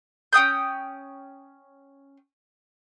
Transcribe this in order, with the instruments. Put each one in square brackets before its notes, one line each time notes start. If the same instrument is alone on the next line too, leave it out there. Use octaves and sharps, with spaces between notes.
[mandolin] C#4 G5 D#6 G6